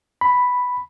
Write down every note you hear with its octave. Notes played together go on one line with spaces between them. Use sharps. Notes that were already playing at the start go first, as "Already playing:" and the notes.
B5